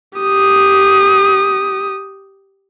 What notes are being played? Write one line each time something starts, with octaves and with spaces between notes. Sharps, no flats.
G4 D#6